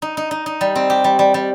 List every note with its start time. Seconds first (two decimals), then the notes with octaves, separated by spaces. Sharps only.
0.02 D#4
0.17 D#4
0.31 D#4
0.46 D#4
0.61 G3
0.75 C4
0.90 G4
1.04 G3
1.19 G3
1.34 G3